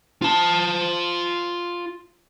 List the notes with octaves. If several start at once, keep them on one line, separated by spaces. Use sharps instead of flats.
F4 A5